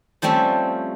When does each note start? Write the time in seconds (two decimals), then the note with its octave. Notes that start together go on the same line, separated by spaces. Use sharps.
0.22 F3 G3 A3 C4 C#4